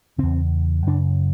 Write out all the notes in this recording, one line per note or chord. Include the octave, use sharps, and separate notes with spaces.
E2 C#3 C4
F#2 C#3 D4